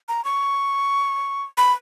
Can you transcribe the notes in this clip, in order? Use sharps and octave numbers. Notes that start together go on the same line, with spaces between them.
A#5
C#6
B5